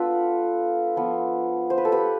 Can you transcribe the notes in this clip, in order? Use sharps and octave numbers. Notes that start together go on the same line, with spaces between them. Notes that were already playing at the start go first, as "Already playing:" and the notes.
Already playing: B3 D4 F4 A4 B4
F3 B3 F4
C5
B4
A4
G4 B4